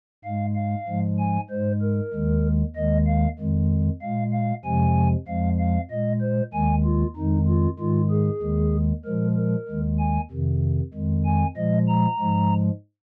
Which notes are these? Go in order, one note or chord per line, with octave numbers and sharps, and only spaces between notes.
G#2 G#3 F5
F5
G#2 F3 G#3
G#5
G#2 G#3 C5
A#4
D#2 D#3 G#3
D#2 D#3 G#3 D#5
F5
F2 D#3 G#3
A#2 G#3 F5
F5
F2 C3 F3 G#3 G#5
F2 F3 G#3 F5
F5
A#2 G#3 D#5
C5
D#2 D#3 G#3 G#5
F4
F2 D#3 G#3 D#4
F4
G#2 D#3 G#3 F4
G#4
D#2 D#3 G#3
A#2 F3 G#3 A#4
A#4
D#2 D#3 G#3
G#5
F2 C3 D#3
F2 D#3 G#3
G#5
A#2 F3 G#3 D#5
A#5
G#2 F3 G#3